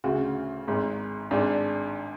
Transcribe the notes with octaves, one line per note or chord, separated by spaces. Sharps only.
D2 C#3 F#4
G#1 G#2
G#1 G#2 D4